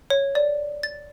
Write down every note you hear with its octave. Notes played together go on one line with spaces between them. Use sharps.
C#5
D5
A6